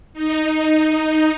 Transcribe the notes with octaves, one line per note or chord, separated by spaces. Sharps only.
D#4